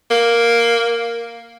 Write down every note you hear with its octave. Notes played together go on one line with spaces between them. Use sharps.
A#3